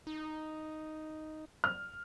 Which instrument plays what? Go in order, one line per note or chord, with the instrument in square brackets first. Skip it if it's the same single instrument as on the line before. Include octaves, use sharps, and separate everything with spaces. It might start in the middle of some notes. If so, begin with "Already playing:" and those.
[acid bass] D#4
[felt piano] F6